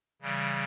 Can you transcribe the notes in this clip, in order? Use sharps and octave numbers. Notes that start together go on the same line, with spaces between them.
C#3 E3 G3